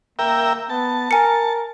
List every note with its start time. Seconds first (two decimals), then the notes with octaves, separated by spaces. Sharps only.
0.19 A#3 A#4 E5 G5
0.70 B3 A5
1.11 A#4 G#5 C#7